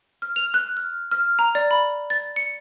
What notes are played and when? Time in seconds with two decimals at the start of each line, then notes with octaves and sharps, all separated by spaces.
0.22 F6
0.36 F7
0.54 F#6
0.77 F6
1.11 F6
1.39 A#5
1.55 D5
1.71 B5
2.10 A6
2.36 C#7